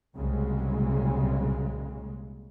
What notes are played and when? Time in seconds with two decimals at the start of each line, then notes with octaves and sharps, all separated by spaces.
0.15 C2 A#2 C#3 F#3 G#3